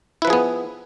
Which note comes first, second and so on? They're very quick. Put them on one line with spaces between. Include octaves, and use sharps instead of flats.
E4 B4 F3 G#4 B3